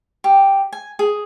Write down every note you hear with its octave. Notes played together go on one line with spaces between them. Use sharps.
G4
G#5
G#4